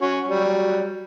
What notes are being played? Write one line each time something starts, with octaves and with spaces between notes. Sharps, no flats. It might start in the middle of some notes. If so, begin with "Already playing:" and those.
C#4 F#4
F#3 G3